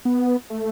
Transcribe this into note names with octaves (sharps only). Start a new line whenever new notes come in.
B3
A3